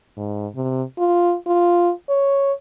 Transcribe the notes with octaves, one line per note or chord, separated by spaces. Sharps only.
G#2
C3
F4
F4
C#5